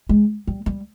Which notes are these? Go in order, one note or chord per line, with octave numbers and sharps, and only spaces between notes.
G#3
G3
G3